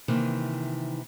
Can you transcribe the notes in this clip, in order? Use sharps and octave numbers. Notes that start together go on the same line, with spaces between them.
C3 D#3 E3 A#3